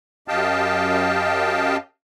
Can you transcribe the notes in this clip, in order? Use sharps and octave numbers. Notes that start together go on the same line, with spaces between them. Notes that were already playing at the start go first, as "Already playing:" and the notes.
F#2 G4 D#5 F5 G5 A5